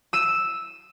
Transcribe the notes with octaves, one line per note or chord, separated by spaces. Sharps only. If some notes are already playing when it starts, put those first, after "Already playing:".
E6 D#7 E7